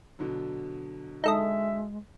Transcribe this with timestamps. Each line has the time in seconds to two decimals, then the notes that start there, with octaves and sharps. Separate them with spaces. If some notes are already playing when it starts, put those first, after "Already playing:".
0.19 B2 D3 F#3
1.24 G#3 D#4 A4 D#5 E5